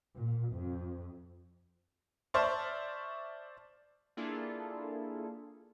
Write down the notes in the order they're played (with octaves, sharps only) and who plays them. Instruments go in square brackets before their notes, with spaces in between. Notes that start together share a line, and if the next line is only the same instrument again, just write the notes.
[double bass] A#2
F2
[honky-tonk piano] C5 D5 E5 A5 C#6 F6
[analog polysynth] A#3 D4 E4 F4 G#4 A4